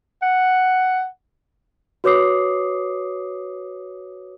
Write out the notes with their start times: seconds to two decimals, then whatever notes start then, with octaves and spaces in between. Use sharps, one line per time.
0.23 F#5
2.04 F#4 B4 C#5 D6 D#6 C7